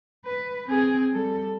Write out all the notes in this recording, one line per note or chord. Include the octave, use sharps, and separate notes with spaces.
B4
C4 G#4
G3 A4